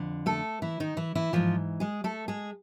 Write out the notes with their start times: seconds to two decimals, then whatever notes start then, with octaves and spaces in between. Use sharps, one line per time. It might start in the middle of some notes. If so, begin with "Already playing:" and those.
Already playing: F2 D3
0.26 A3 A4
0.62 E3 E4
0.80 D#3 D#4
0.97 E3 E4
1.15 E3 E4
1.33 G#2 E3 F3 F4
1.80 G#3 G#4
2.04 A3 A4
2.28 G#3 G#4